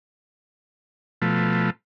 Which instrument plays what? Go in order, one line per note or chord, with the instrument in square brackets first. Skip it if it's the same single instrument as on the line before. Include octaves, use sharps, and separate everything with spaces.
[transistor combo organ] B2 F3 A3